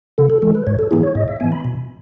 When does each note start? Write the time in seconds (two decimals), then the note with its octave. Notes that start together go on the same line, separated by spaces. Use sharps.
0.18 C#3 A4
0.30 A4
0.42 E3 G#3 A4
0.55 B4
0.67 G#2 C#5
0.79 A4
0.91 E3 B3 E4 G#4
1.03 C#5
1.15 G#2 D#5
1.28 E5
1.40 E3 B3 G#5
1.52 B5
1.65 B2